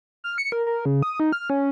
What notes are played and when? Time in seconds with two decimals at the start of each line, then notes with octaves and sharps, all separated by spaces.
0.24 F6
0.38 C#7
0.52 A#4
0.67 A#4
0.85 C#3
1.03 D#6
1.20 D#4
1.32 F6
1.50 C#4